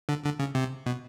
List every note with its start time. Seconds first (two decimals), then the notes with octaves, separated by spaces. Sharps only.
0.09 D3
0.24 D3
0.39 C#3
0.55 C3
0.86 B2